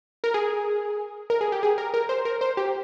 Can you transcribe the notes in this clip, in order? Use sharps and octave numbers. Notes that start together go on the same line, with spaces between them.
A#4
G#4
A#4
G#4
G4
G#4
A#4
A#4
C5
A#4
C5
G4